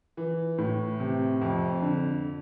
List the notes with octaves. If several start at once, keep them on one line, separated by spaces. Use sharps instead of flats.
E3
A2
C3
F2
D3